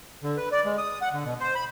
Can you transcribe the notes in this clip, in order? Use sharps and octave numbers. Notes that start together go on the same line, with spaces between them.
D3
B4
D5
G#3
D#6
F#5
D3
B2
C5
B5